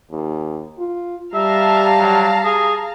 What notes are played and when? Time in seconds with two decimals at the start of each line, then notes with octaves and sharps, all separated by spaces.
0.11 D#2
0.79 F4
1.34 G3 E5 F5 A5 A#5
1.99 F#3
2.45 G#4